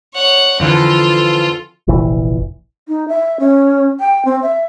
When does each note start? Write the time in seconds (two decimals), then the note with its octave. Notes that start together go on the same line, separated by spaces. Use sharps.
0.14 C#5 F#5
0.60 F2 D3 E3 F4 A4
1.88 F1 A#1 E3
2.88 D#4
3.08 E5
3.40 C#4
4.00 G5
4.25 C4
4.42 E5